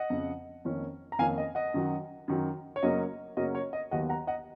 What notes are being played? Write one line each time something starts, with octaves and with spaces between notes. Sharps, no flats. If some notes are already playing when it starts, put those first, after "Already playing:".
Already playing: D#5 F#5
F2 C#3 F3
F2 D#3 A#3 C#4
A#5
F2 D#3 A#3 C#4 F5 G#5
D#5
D#5 F#5
F#2 D#3 F#3
F#2 D#3 F#3
C#5
F#2 C#3 F#3 A#3 C#4 D#5
F#2 C#3 F#3 A#3 C#4 D#5
C#5
D#5
D#2 D#3 F#3 B3 D#5 F#5
F#5 A#5
D#5 F#5